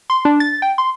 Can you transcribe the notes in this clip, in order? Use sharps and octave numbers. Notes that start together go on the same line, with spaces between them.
C6
D4
A6
G5
C6